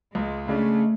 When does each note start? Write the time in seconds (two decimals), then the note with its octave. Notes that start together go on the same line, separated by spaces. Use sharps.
0.15 C#2 G#3
0.48 C#3 G#3 A3 D4